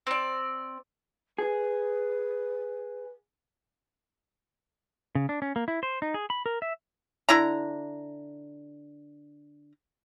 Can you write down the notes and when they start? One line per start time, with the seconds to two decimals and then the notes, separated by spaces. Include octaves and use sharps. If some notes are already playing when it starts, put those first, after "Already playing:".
0.07 C4 D5
1.39 G#4 B4
5.15 C#3
5.29 D4
5.42 C#4
5.56 A#3
5.68 E4
5.83 C5
6.02 D#4
6.14 G#4
6.30 B5
6.46 A#4
6.62 E5
7.29 D3 E4 A#5